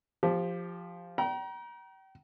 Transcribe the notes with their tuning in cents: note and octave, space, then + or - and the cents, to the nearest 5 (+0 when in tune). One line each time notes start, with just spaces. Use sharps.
F3 +0 G4 +20
G5 -35 A#5 +30